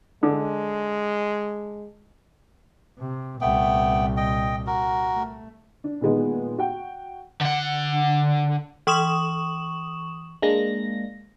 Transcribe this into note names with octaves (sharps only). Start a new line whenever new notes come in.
D3 G#3
C3
C2 A#2 A3 B3 G5
D#5 G5
F#4 A#4
A3
D4
A#2 D#3 G#3 B3
F#4 G5
D3 F#5
E3 C#6 D#6 E7 F#7
G#3 A#3 D4 A#6